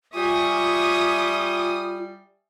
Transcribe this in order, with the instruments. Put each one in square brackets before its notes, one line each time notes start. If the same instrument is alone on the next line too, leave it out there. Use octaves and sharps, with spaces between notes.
[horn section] G3 [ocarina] F4 [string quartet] E5 G#5 C#6 [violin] D#6